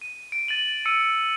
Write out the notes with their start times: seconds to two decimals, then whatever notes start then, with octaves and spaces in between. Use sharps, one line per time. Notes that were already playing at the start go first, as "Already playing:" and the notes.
0.01 D#7
0.32 D7
0.48 A6 D#7 F#7
0.85 E6 C#7 D#7